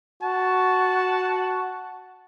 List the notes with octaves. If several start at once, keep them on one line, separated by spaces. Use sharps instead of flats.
F#4 A5